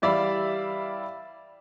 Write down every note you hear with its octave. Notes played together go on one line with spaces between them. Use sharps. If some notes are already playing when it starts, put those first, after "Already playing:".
E3 G3 D5 E5 F5 B5